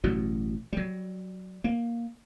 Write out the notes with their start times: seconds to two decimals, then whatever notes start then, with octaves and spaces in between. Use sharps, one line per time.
0.04 A1 B2 F#3
0.73 F#3 G3
1.64 A#3